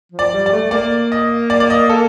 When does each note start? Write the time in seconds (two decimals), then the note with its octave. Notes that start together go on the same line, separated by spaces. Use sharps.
0.12 F3
0.19 D5
0.33 G3
0.46 D5
0.52 A3
0.71 A#3 D5
1.12 D#5
1.50 D5
1.60 D5
1.70 D#5
1.90 A4